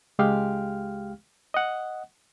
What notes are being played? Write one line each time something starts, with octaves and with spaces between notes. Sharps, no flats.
C#2 G#3 G4 F5 G5 F6
D#5 F#5